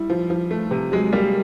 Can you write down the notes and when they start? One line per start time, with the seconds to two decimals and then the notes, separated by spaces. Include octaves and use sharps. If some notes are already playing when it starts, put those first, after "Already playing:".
Already playing: G3 E4
0.10 F3
0.30 F3
0.51 A3
0.71 C3
0.92 F#3 G#3
1.13 G3 A#3